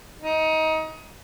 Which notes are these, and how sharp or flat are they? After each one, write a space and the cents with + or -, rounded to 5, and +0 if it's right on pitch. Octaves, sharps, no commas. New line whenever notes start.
D#4 +25